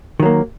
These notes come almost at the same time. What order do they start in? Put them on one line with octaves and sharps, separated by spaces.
D#3 F#3 A#3